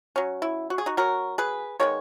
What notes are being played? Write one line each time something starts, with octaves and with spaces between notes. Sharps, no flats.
F#3 C#4
E4
F#4
G#4
D#4 F#4
F#3 C#4 F#4 A#4
G#4 B4
D#3 G#3 B3 C#5